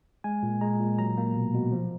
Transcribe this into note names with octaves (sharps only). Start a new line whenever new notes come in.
G#3 G#5
A#2
G#3 A#5
A#2
F#3 A#5
A#3
B2
B2
F3